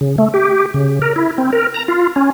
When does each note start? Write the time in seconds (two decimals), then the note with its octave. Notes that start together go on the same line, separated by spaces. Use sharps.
0.01 C#3
0.18 A3
0.34 G4
0.74 C#3
1.02 A#4
1.16 E4
1.38 C4
1.53 A#4
1.74 A#5
1.88 F4
2.16 C#4